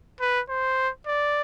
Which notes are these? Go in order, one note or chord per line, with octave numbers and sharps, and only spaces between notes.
B4
C5
D5